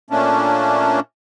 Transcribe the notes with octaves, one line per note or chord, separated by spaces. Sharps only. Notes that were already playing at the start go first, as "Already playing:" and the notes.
A#2 A3 A#3 C#4 D4